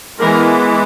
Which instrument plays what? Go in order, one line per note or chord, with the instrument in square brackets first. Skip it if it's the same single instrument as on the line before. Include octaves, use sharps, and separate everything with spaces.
[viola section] E3 G#3 B3 A#4